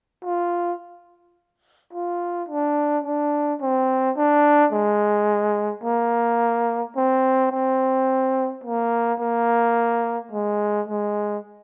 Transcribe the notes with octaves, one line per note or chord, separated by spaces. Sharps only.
F4
F4
D4
D4
C4
D4
G#3
A#3
C4
C4
A#3
A#3
G#3
G#3